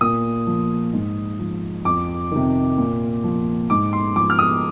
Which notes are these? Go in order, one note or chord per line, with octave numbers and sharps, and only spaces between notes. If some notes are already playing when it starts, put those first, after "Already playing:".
A#2 D#6
F3
G#2
F3
F2 D6
C3 D#3
A#2
F3
G#2 D6
C6
F3 D6
F6
D#6